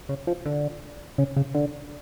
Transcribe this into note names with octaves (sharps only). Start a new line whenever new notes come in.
C#3
F3
D3
C#3
C#3
D3